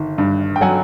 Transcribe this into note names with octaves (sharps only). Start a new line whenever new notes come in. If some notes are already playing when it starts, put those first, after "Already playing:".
Already playing: G1 D#3
G2
G5
F#3 F#5 G#5